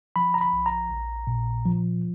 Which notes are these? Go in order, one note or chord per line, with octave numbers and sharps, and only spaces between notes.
F3 B5
A#5
B5
A#1
A#5
A#1
A#2
F3